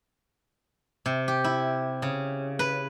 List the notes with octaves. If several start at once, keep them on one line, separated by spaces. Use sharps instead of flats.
C3
G4
E4
C#3
B4